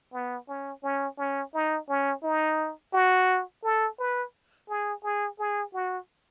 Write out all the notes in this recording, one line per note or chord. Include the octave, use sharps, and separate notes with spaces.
B3
C#4
C#4
C#4
D#4
C#4
D#4
F#4
A4
B4
G#4
G#4
G#4
F#4